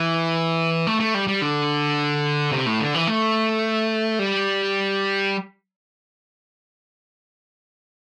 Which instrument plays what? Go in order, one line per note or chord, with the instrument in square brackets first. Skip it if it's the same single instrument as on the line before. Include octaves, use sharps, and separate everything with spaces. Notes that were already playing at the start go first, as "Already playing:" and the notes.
Already playing: [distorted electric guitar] E3
A3
A3
G3
G3
D3
C3
A2
D3
E3
A3
G3